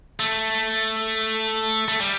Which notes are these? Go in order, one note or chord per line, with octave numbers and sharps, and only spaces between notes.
A3
A3
G3